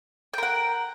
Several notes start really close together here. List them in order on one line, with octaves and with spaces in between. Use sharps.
G5 A#4 F#5